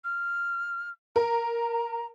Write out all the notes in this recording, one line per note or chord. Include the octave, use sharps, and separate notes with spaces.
F6
A#4 A#5